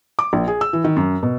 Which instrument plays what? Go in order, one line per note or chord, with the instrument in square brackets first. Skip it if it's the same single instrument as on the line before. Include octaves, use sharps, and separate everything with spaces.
[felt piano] D6
A#1
G#4
E6
E3
D#3
F#2
B2